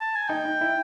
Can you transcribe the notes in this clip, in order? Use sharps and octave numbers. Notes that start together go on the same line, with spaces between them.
A5
G#5
D#4 G5
D#4
E4